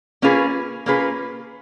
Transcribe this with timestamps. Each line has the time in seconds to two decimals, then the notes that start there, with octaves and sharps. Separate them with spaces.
0.22 A#3 C#4 F4 G#4 B4
0.86 A#3 C#4 F4 G#4 B4